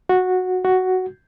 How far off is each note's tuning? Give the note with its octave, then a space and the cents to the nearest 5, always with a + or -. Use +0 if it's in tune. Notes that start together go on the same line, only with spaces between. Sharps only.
F#4 -10
F#4 +5